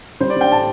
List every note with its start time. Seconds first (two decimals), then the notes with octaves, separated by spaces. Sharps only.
0.20 G3 C5
0.30 D5
0.36 G3 G5
0.51 A2 A5